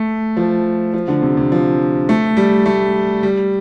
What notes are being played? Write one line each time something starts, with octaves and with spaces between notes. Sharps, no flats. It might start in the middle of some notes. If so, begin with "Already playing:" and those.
Already playing: A3
F3
F3
D3
C3
C3
F3
A3
G3
A3
G3